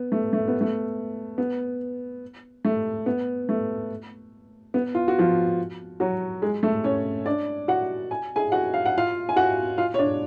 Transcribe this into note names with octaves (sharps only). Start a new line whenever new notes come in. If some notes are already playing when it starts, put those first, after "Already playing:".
Already playing: B3
A3
A3
B3
A3
B3
A3
B3
A3
B3
F4
F#4
F3 F4
F#3 F#4
G#3 G#4
A3 A4
C#4 C#5
D4 D5
F#4 F#5
G#5
G#4 G#5
F#4 F#5
F5
F#5
F4 F5
G#5
F#4 F#5
F4 F5
C#5
D4 D5